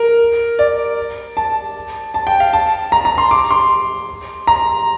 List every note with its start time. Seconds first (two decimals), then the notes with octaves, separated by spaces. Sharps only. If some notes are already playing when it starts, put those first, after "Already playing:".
Already playing: A#4
0.59 D5
1.37 A5
2.14 A5
2.27 G5
2.40 F5
2.53 A5
2.92 A#5
3.05 A#5
3.18 C6
3.31 D6
3.51 C6
4.47 A#5